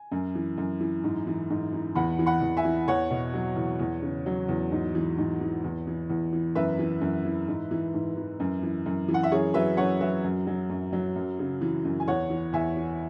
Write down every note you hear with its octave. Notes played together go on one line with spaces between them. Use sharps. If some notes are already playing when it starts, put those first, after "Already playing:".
Already playing: G#5
F#2
E3
F#2
E3
G#2
E3
G#2
E3
E2 F#5 B5
E3
F#5 B5
E2
E5 G#5
E3
E2 C#5 F#5
B2
F#3
E2
E2
C#3
F#3
E2
G#2
E3
G#2
E3
E2
E3
E2
E3
F#2 B4 E5
E3
F#2
E3
G#2
E3
G#2
E3
F#2
E3
F#2
E3
F#5
E5
F#2 G#4 C#5
F#3 B4 E5
F#2 C#5 F#5
F#3 B4 E5
F#2
F#3
F#2
F#3
F#2
C#3
E3
F#2
G#5
E2 C#5 F#5
E3
E2 E5 G#5
E3